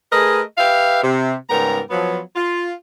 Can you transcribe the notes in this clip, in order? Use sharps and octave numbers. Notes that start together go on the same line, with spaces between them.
A3 G#4 A#4 B4 D#5
G4 B4 E5 F5
C3
G#2 C#3 G3 B3 A#4 A#5
F3 F#3 B3
F4